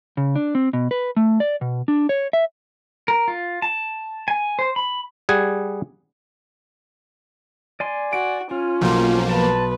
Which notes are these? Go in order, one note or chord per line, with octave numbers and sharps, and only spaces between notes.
C#3
D4
C4
B2
B4
A3
D5
B2
D4
C#5
E5
A#4
F4
A5
G#5
C5
B5
G3 G#4 F#5 G#5
D5 G#5 C6
F#4 D7
C#4 F4
B1 F3 A#3
B4 A5